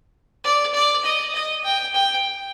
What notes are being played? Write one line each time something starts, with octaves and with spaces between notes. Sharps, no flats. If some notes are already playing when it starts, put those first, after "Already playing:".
D5
D5
D#5
D#5
G5
G5